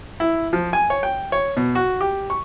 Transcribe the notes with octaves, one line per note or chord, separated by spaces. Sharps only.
E4
F3
G#5
C#5
G5
C#5
B2
F#4
G4
C#6